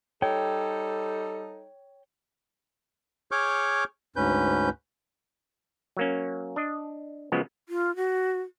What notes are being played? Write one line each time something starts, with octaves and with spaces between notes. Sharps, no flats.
G3 D#4 A4 C#5 G5
G#4 C#5 C#6 D6 F6 G6
D2 G#2 C#4 B4 G6
F#3 A#3 C#4
D4 D#5
C#3 F3 F#3 G#3 B3
F4
F#4